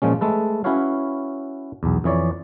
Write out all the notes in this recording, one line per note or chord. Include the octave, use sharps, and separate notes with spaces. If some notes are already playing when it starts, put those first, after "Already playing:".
A#2 F3 G#3 C#4
G#3 A3 A4 B4
C#4 E4 F#4 B4 C#5 F5
B1 E2
F2 E3 C#5 D5